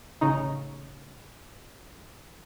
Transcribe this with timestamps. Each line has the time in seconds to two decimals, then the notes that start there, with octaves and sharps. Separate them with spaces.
0.21 A1 C#3 D#4